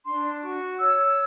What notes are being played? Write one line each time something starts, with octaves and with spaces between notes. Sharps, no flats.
D4 C6
F#4 C#6
C#5 E6